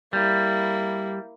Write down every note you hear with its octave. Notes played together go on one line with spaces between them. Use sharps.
G3 A#3 E4